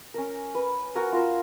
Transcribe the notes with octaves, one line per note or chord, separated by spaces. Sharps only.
C#4 A#4
B4
F#4 A#4 G#5 A#5
F4 A#4 E6